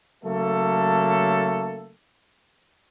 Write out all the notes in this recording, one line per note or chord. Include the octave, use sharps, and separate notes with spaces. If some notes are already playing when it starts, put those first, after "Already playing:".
C#3 F#3 A3 A#3 A4